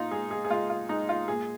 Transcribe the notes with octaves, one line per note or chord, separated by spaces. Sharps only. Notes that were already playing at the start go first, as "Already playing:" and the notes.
Already playing: A#2 D#4 F4
G#3 G#4
G#4
G#4
G#3 F4
F4
G#3 D#4
F4
A#2 G#4